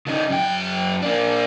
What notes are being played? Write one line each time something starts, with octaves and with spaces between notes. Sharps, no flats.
C#3 D#4
F#2 G5
A#3 D4